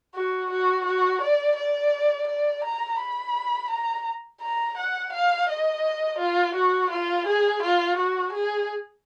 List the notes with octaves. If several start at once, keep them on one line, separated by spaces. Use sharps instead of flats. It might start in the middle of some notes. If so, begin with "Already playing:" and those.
F#4
F#4
F#4
D5
D5
D5
A#5
B5
A#5
A#5
F#5
F5
D#5
F4
F#4
F4
G#4
F4
F#4
G#4